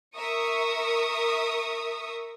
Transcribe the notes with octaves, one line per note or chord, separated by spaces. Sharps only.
A#4 E5 C#6 D#6